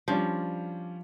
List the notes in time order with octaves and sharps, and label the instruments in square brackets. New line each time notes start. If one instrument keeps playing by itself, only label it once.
[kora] F3 [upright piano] G3 C#4 D4